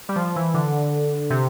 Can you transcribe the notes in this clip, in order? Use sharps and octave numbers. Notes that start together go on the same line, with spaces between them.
G3
F3
E3
D3
C3